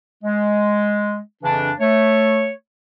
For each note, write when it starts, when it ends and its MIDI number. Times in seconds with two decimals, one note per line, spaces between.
0.23 1.18 56
1.43 1.71 41
1.43 1.71 49
1.43 1.71 52
1.43 1.71 62
1.80 2.49 57
1.80 2.49 73